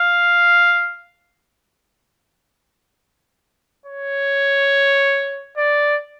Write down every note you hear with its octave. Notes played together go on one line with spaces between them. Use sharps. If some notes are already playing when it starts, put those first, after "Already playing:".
Already playing: F5
C#5
D5